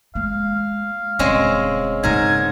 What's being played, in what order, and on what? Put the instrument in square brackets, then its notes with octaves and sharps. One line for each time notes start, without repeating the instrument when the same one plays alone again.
[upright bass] G#3 A#3 [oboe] F5
[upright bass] D#1 C#3 [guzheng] G#3 C4 C#4
[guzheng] G#2 A#4 [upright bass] C#3 A#3 [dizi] G#6